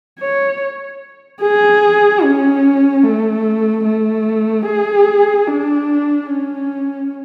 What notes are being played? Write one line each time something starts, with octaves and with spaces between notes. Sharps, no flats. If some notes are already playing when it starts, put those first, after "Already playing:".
C#5
G#4
C#4
A3
A3
G#4
D4
C#4